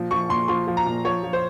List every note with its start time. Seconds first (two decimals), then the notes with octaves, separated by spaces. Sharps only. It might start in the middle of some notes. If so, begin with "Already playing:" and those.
Already playing: A#2 F3
0.11 F3 C#6
0.29 A#2 C6
0.48 F3 C6
0.68 F3
0.77 A#5
0.86 A#2
1.05 F3 C#5
1.23 F3
1.33 C5